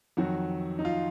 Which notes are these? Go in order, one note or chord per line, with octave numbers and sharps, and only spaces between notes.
F2 D#3 F#3 F#4
D#4
F4